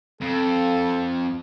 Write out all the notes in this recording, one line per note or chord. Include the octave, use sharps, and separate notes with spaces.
F2 A4